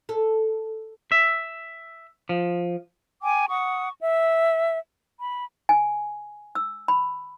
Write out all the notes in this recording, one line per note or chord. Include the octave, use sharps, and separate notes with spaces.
A4
E5
F3
G5 G#5 D6
F#5 C#6 D#6
E5
B5
G#5
E6
B5